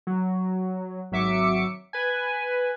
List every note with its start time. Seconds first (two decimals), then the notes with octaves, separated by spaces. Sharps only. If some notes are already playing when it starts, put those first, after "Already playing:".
0.07 F#3
1.12 G#1 F#3 E5 D6 C#7
1.93 B4 G#5